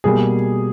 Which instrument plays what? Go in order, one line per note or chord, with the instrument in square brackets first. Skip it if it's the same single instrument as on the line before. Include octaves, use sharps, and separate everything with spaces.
[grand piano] B2 G3 A#3 G#4